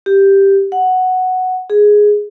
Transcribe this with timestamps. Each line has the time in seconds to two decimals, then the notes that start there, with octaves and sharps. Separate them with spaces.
0.06 G4
0.72 F#5
1.70 G#4